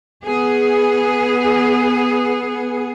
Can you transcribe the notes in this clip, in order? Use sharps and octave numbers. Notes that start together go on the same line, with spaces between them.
B3 G#4